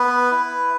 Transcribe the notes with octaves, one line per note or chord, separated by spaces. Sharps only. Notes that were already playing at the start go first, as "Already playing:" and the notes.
Already playing: B3 B4
E4